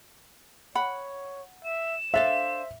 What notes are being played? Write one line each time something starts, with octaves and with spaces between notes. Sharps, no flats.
C#5 F#5 B5
E5 E7
D4 A4 C5 E5 F5